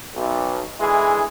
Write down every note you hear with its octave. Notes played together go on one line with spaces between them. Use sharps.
B1
D3 E3 G#3 E4 G#4